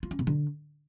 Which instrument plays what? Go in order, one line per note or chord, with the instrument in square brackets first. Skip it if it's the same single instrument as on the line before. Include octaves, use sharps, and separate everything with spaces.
[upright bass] F4
C#4
C3
D3